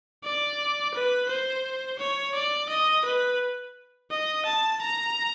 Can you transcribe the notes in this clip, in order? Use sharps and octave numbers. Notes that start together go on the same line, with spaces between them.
D5
B4
C5
C#5
D5
D#5
B4
D#5
A5
A#5